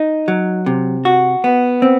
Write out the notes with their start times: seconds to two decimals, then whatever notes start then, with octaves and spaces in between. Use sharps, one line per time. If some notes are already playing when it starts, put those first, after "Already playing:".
Already playing: D#4
0.28 F#3
0.66 C3
1.05 F#4
1.44 B3
1.82 C4